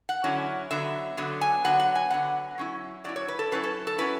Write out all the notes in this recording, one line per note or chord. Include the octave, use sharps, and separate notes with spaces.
F#5
D3 F#3 C#4 E4
D3 F#3 B3 E5
D3 F#3 B3
G#5
D3 F#3 B3 F#5
F#5
G#5
D3 F#3 B3 F#5
F#3 C#4 E4
F#3 C#4 E4 D5
C#5
B4
A4
F#3 C#4 E4 B4
A4
A4
F#3 C#4 E4 B4